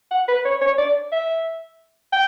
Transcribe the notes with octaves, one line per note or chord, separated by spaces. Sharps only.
F#5
B4
C#5
C#5
D5
E5
G5